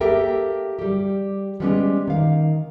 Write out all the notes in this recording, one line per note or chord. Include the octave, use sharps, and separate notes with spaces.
A#3 G4 A4 A#4 E5 G5
G3 G4
G3 G#3 B3 C#4 F4 G4
D#3 F5